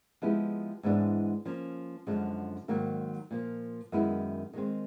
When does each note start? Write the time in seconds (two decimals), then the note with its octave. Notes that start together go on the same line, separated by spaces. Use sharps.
0.22 F3 G#3 B3 E4 G4
0.83 G#2 E3 G#3 B3 D4
1.45 F3 A#3 C#4
2.07 F#2 D3 F3 G#3
2.68 G#2 D#3 F#3 A#3
3.31 A#2 F3 A#3
3.92 F#2 D#3 G#3 B3 E4
4.53 D#3 G#3 C4